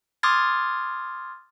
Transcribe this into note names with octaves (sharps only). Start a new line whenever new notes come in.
C6 D6 D#6 F6 G#6 A6